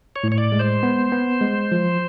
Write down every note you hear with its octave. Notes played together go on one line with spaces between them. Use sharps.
C#5
A2
C#5
D5
G#3
C5
B3
B3
G#3
F3